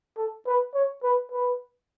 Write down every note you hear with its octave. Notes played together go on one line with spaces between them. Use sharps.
A4
B4
C#5
B4
B4